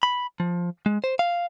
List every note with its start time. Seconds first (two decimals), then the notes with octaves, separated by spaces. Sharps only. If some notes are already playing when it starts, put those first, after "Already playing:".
0.03 B5
0.40 F3
0.86 G#3
1.04 C5
1.19 F5